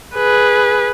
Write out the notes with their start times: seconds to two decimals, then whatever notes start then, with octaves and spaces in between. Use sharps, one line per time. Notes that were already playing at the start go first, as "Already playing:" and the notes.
0.16 G#4 B4